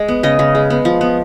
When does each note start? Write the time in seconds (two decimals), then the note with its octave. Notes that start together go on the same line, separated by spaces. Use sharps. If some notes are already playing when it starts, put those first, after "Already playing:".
Already playing: G#3
0.08 B3
0.23 C#3 D#5
0.39 C#3
0.55 G#3
0.70 B3
0.85 F3
1.01 B3